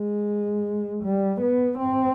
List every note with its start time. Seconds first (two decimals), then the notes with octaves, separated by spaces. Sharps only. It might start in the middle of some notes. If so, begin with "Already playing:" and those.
Already playing: G#3
1.04 G3
1.41 B3
1.78 C4